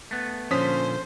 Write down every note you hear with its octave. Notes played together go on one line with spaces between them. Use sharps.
A3 B3
A#2 D3 F3 C#4 C5 D#6 B6